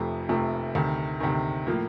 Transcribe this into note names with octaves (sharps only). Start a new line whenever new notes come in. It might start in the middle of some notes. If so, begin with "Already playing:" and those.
Already playing: F1 F2 C3 F3 A3
F1 F2 C3 F3 A3
D2 C3 D#3
D2 C3 D#3
A2 F3 A#3